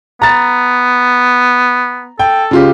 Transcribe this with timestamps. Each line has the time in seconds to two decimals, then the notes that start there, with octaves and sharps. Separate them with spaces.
0.22 B3 A#5 A6
2.19 A4 G5
2.51 C#3 F4 G4